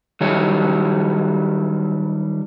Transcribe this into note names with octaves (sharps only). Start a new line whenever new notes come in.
D#3 F#3 G3 E4 C#5 G#5